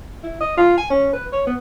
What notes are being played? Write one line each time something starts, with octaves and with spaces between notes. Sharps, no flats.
E4
D#5
F4
G#5
C#4
B4
C#5
B3